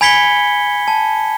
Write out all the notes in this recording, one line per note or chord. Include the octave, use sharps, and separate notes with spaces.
G#5 B5 G#6 B6 C#7 G7
A5